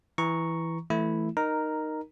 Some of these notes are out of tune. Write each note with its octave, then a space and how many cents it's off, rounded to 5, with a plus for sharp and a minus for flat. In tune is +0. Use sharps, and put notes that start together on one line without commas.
E3 +0 A#5 +0 C#6 +0
E3 +0 A3 +0 E4 +0
D#4 -10 A#4 +0 A#5 +0